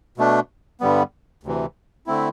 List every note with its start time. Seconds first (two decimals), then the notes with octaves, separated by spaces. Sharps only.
0.18 B2 A3 D4
0.81 G2 D3 G3 B3
1.43 D2 C3 E3
2.07 D3 A3 C4 E4